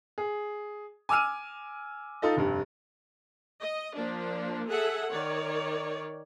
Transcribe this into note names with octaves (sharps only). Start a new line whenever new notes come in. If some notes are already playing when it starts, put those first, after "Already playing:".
G#4
G#5 D6 E6 F6 D#7
D#4 F4 A4 D#5
F1 G2
D#5
F3 A#3 D4
G#4 A4 E5 F#5
D#3 C#5 D5